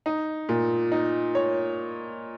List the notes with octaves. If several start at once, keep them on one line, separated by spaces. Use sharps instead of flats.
D#4
A#2
D#4
C#5